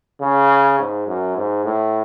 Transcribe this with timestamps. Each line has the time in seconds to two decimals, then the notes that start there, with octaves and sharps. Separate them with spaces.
0.21 C#3
0.79 G#2
1.08 F#2
1.37 G#2
1.65 A2